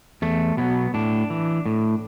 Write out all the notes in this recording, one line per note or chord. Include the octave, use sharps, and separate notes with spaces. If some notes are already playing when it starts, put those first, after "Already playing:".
E2 A3
B2 F#3 B3
A2 D4
E3
A2